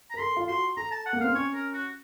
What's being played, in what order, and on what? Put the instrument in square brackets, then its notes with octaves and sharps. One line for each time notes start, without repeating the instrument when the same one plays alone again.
[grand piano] A#4 [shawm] A#5
[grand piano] A4 [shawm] C6
[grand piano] F4
[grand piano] F#4 [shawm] C6
[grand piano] A4 [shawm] A#5
[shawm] A5
F#5
[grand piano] A#3
[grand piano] C4 [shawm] F5
[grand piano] C#4 [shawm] C#5
[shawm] A#4
F#4